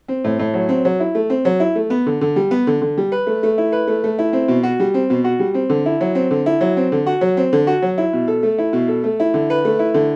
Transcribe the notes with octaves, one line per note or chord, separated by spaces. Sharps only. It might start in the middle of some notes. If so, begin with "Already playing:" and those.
C4
A2
A2
F#3
C4
F#3
E4
A3
C4
F#3
E4
A3
B3
D3
D3
G3
B3
D3
D3
G3
B4
A3
A3
E4
B4
A3
A3
E4
C4
B2
F#4
G3
C4
B2
F#4
G3
C4
D3
E4
F#3
C4
D3
E4
F#3
C4
D3
F#4
F#3
C4
D3
F#4
F#3
E4
B2
A4
A3
E4
B2
A4
A3
E4
D3
B4
A3
E4
D3